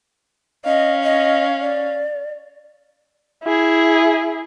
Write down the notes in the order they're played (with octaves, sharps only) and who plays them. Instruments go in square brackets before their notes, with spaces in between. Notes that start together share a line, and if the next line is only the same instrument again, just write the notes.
[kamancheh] C#4 F5 [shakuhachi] D#5
[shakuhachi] D#5
D5
[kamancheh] E4 G#4